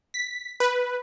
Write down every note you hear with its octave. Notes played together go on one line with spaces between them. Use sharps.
B6
B4